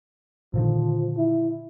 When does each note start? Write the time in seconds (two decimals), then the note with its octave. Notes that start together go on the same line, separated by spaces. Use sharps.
0.54 A#2 D3 D#3 F3
1.18 E4